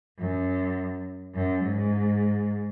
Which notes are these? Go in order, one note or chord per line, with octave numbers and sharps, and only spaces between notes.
F#2
F#2
G#2